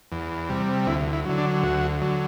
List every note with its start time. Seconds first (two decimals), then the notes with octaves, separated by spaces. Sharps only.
0.12 E2
0.49 C3 G3
0.87 D2 E4
1.13 E4
1.25 D3 F#3
1.38 D4
1.63 D2 F#4
2.02 D3 F#3